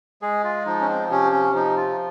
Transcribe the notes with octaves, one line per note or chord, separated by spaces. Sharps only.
G#3 G#4
F4
F3 D#4
C#4
C4
C3 C#4
C#4
F3 D#4
F4